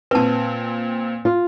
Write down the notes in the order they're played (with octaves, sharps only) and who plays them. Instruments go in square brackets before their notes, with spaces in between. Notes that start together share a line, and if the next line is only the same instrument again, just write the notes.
[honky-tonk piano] A#2 C4 [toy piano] B4 A5
[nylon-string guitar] F4